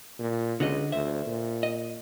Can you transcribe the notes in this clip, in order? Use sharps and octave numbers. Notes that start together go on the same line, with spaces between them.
A#2
C#2 D3 F#4 D#5
D2 C5 E5
A#2
D#5